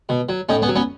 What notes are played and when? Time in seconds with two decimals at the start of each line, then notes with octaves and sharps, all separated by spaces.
0.09 B2
0.29 F#3
0.49 A2 C#4 D#4
0.62 B3 C#4
0.68 F#3
0.76 B3 C#4